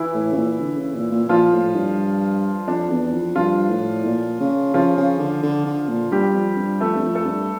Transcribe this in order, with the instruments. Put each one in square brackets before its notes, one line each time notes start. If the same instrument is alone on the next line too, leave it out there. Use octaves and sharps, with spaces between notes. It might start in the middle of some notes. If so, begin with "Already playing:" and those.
Already playing: [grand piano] E3 E4
[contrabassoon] A2
C#3
A#2
D3
C#3
A#2
A#2
[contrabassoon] A#2 [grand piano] F3 F4
[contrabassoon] A2
G2
[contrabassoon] F2 [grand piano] D4
[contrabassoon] E2
F2
[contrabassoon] G2 [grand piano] F3 F4
[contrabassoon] A2
A#2
C#3
[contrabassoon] C#3 [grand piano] F3 F4
[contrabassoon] C#3
D3
D3
D3
A#2
[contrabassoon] G2 [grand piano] G3 G4
[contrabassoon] F2
G2
[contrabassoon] F2 [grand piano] A3 A4
[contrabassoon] G2
F2
[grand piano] A3 A4
[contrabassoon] G2